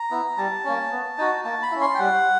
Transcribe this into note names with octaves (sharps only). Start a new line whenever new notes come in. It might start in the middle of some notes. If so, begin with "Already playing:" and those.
Already playing: A#5
B3 E4
G3 A5
A#3 C#4
B3
D#4 F#4
A#3 A5
B5
C#4 E4
C6
G5
G3 F#5